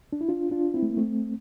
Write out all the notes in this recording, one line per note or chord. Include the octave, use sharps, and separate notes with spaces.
D4
E4
D4 F4
D4 F4
C4 E4
A3
A#3
A3 C4